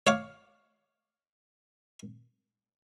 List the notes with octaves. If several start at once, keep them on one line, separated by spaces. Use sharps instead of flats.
C#5 F5 D6